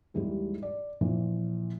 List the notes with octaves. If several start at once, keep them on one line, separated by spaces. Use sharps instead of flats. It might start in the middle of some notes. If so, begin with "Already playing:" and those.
D#2 G#2 E3 G3 G#3
D5
A#2 E3 F3